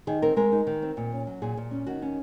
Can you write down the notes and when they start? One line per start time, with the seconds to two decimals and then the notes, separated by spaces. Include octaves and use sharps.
0.07 D#3 G#4
0.22 C4 A#4
0.36 G#3 A#4
0.52 D#4
0.67 D#3
0.82 C4
0.97 A#2
1.12 C#4
1.27 F#3
1.42 A#2 G#4
1.57 A#2
1.71 C#4
1.87 D#3 F#4
2.02 C#4